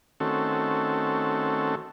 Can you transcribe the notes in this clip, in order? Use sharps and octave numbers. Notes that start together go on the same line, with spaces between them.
D#3 A3 C4 C#4 F#4 A4